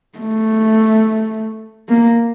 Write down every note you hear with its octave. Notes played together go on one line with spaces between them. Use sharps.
A3
A#3